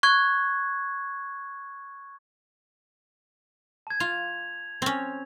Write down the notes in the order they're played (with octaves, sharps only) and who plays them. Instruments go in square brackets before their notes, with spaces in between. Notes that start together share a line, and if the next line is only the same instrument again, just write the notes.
[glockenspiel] C#6 F#6 G#6
A5 G#6
[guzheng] F4 [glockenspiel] F7
[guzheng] C4 C#4